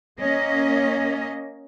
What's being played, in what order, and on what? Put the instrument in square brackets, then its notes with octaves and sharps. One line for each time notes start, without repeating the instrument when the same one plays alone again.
[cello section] A#3 C#4 D#5